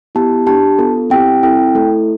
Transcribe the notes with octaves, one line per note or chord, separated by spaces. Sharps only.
B3 E4 G4 A5
D4 G4 A5
B3 F4 A4
C4 E4 G4 G5
C4 E4 A4 G5
A3 E4 A4